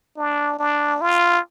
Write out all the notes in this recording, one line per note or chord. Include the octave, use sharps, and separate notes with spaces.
D4
D4
F4